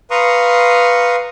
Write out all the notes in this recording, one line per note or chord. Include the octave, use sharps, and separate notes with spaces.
B4 F5 A#5 C6 C#6 D#6